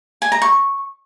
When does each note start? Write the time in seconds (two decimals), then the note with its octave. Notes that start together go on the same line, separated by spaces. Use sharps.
0.22 G#5
0.32 A#5
0.42 C#6